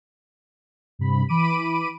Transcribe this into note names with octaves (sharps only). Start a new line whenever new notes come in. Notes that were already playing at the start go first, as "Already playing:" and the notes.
G2 C3 B5
E3 B5 D6 D7 D#7